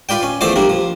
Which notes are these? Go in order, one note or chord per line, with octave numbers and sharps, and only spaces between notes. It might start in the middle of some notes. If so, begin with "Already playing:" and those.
F4 B4 D5 G5
C#4
E2 F3 A3 C5 D5 D6
G3 A#3 D4
F3